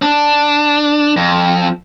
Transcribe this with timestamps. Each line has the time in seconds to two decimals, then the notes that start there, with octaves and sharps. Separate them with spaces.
0.02 D4
1.17 F2